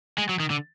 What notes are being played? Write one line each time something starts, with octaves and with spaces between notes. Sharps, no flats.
G#3
F#3
D#3
D3